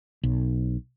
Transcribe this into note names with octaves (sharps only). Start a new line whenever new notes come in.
B1